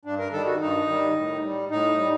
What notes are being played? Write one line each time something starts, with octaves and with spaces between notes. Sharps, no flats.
G2 D4
A#4
D#3 G3 A4
F#4
G2 D#4
D#3 G3
A2
G3
A2 D#4
G3